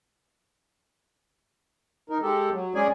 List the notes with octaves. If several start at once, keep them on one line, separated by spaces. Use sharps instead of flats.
D#4 A#4
G#3 G4 A4
F#3
G#3 C#4 G#4 D5 G#5